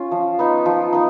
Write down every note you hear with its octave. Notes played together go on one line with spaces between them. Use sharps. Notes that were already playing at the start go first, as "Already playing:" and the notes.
Already playing: C#4 F4
F3
B3 D#4
F3
B3 D#4